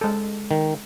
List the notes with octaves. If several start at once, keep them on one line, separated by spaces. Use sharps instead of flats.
G#3 A4
D#3